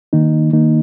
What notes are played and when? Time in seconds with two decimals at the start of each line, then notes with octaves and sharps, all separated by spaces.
0.13 D#3 A#3 D#4
0.53 D#3 A#3 D#4